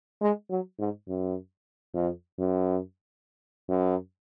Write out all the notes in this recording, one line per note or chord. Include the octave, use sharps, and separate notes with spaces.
G#3
F#3
G#2
F#2
F2
F#2
F#2